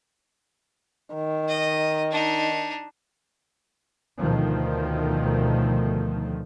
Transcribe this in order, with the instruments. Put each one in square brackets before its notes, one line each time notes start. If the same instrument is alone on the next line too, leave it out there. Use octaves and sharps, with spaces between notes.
[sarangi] D#3
[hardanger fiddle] D#5
D4 D#4
[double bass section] D2 B2 D#3 F3 A3